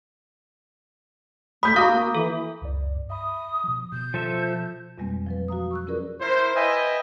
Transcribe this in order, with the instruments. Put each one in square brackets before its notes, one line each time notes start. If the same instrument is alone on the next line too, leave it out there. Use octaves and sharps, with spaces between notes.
[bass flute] A3 [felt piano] B5 G6 B6 [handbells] D#6
[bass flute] F#4 [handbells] F5 [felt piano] A#5 D6 D#6
[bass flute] A#3
[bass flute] E3 [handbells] A4
[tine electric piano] C#2 F#2 D5
G2
[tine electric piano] E5 B5 [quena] D#6
[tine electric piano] B2 F3
[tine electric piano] B2 [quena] G6
[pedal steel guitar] F3 A4 E5
[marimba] F2 B2 G3 G#3 A#3 C4
F3 F#3 B4
F#4 F5 A#5 D#6
C#6 E6 F#6
C#4 F4 G#4 A#4 B4 D5
[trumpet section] E4 A#4 C5
B4 D#5 E5 G5 G#5